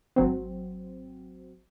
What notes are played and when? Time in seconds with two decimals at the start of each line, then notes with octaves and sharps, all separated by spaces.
0.16 G#1 F#3 C4